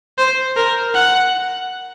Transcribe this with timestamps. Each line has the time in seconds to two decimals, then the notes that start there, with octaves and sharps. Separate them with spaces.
0.18 C5
0.57 A#4
0.95 F#5